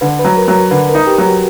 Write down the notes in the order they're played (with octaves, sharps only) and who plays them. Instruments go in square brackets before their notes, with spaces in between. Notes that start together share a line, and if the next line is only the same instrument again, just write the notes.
[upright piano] D3 [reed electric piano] B4
[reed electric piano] B4
[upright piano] F#3
[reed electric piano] A#4
[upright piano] F#3
[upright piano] D3 [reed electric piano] B4
[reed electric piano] A#4
[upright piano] D#4
[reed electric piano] G4
[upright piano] F#3
[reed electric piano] F#4